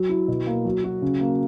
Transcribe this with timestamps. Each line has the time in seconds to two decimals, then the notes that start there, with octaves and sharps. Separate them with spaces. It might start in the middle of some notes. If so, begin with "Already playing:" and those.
Already playing: F#3
0.09 E4
0.28 B2
0.47 A#3
0.65 F#3
0.84 F#4
1.02 C#3
1.21 A#3